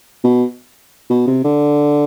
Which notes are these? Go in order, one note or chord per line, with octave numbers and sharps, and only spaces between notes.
B2
B2
C3
D3